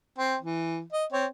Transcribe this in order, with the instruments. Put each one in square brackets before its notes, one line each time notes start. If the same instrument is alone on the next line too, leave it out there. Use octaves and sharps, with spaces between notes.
[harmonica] C4
E3
D#5
C4 C#5